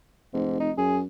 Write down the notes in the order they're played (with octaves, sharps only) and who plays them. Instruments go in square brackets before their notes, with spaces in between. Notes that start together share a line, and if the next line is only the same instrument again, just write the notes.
[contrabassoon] F1 [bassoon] G#2
[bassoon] D#4
[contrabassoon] F#2 [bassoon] G#4